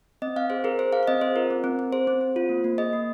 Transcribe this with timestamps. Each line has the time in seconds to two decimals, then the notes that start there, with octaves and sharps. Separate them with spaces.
0.22 C4 D#5
0.36 C4 F5
0.50 G#4 C5
0.64 G#4 A#4
0.79 G#4 C5
0.93 G#4 F5
1.03 F5
1.08 C4 D#5
1.21 C4 C5
1.36 F4 A#4
1.50 C4
1.64 C4
1.79 C4
1.92 G#4 C5
2.07 C4
2.21 C4
2.36 F4
2.49 A#3
2.64 A#3
2.78 G#4 D#5
2.93 A#3